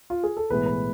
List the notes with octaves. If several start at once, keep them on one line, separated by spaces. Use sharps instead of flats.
F4
G#4
A4
B1 A2 E3 G#3 B3 B4
B4